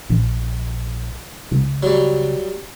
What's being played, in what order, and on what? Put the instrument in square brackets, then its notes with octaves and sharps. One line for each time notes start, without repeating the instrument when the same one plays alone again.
[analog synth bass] A#1
C#2
[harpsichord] F#3 G3